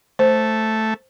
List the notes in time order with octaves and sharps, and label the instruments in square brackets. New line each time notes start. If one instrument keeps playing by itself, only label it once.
[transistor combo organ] A3 [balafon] C5